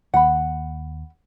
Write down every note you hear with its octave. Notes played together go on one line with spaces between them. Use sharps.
D#2 F#5 B5